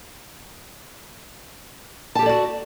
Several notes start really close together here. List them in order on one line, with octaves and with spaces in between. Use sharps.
A5 G4 A4 D5 F#4